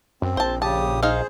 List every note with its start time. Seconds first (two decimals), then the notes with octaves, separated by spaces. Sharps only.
0.22 F#2 C4
0.37 A#1 C5 A5
0.62 C#3 G4 A5 D#6
1.03 D#4 G#4 C5 F5